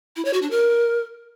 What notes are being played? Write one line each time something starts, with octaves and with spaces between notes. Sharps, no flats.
E4
C#5
F#4
D4
A#4